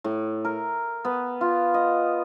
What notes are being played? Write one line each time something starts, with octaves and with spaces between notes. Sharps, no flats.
A2
A#4
B3
F4
D#5